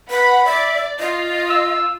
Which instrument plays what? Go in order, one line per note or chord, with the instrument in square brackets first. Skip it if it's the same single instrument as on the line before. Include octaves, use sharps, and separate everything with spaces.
[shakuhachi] B4 [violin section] F#5 B5
[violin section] D5 [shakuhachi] E5
[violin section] F4 [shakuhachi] D#5
[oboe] E6